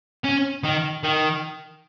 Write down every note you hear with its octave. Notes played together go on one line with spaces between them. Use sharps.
C#4
D#3
D#3